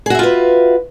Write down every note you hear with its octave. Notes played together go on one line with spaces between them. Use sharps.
F4 F#4 G#4 B4 E5